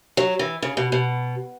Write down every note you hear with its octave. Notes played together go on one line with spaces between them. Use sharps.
F#3
E3
C#3
B2
B2